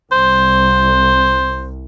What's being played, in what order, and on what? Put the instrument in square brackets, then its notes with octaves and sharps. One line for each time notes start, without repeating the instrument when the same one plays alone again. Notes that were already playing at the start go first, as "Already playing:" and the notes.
[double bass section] C2 [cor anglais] C5